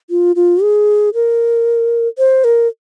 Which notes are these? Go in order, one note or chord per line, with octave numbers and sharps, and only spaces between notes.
F4
F4
G#4
A#4
C5
A#4